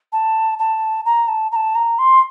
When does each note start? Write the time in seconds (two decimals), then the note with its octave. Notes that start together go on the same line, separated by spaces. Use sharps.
0.13 A5
0.59 A5
1.05 A#5
1.28 A5
1.52 A#5
1.56 A5
1.75 A#5
1.99 C6